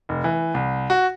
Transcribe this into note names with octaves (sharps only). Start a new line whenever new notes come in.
F1
E3
C2
F#4